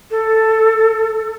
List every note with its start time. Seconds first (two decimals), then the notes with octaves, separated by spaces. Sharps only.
0.11 A4